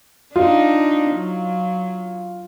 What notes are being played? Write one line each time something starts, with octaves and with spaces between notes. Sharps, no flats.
D4 D#4 F4
F#3